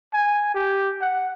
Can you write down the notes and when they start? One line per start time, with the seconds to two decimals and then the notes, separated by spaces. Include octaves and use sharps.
0.13 G#5
0.55 G4
1.01 F#5